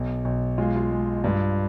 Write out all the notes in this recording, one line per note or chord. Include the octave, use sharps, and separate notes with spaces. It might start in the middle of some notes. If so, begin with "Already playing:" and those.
Already playing: B1
B1
G#3 F4
F4
G#3
G2 F4